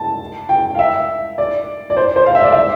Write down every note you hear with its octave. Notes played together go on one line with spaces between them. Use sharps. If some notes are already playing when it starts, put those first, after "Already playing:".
Already playing: A5
G5
F5
E5
D5
D5
C5
C5
F5
E5
D5
E5